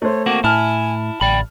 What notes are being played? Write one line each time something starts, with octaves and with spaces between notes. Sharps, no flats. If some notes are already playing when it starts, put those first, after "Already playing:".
A3 C5 C#5
A#3 C4 F#4 D6
A2 E4 G#5 A5 F6
A1 D2 D5 G5 B5